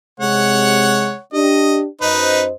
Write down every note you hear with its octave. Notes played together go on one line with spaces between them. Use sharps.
C3 G#3 C#5 F#5
D4 G4 D#5
F#2 D#4 B4 C5 D#5